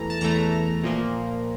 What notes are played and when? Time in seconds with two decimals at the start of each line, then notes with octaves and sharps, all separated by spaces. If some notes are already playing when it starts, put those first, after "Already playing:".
Already playing: E2 E3 A3 A#5
0.10 A5
0.21 E2 E3 A3 A#5
0.84 A#2 F3 A#3